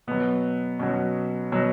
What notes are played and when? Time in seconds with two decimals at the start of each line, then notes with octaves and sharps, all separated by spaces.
0.07 B2 F#3 B3
0.79 B2 F#3 C#4
1.52 B2 F#3